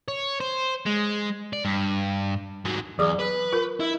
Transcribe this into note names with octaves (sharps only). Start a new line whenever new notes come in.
C#5
C5
G#3
D5
G2
G#2 F#3
E2 F#3 G#4 D6
B4
F4 A#4
E4